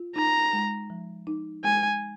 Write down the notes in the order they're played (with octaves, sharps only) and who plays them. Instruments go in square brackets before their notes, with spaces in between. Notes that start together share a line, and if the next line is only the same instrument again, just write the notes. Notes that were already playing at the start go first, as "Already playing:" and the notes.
Already playing: [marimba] F4
[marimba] D#4 [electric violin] A#5
[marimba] G#3
F3
D#4
[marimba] G#3 [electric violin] G#5